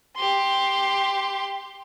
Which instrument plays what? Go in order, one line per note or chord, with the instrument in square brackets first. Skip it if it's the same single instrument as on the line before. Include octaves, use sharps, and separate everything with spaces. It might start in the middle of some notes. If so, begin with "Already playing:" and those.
[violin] G4 C6